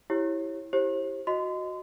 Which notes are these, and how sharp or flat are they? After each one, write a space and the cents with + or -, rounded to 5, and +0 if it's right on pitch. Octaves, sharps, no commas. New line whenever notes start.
E4 +0 G4 +0 C#5 -25
E4 +0 G4 +0 C5 +40
F#4 -10 D#5 +0 C6 -30